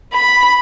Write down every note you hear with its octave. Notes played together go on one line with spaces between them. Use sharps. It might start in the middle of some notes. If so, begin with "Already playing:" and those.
B5